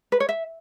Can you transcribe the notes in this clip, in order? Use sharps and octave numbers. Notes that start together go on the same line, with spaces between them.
B4
C#5
E5